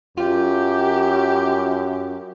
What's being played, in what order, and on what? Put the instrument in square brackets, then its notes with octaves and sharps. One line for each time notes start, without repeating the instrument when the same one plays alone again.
[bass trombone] F#2 [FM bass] F4 [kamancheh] G4